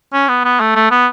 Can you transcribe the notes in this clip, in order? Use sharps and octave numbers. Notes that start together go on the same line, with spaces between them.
C#4
B3
B3
A3
A3
B3